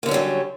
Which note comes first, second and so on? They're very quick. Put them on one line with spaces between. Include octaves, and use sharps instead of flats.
A#3 D3 C#4 G3 F#3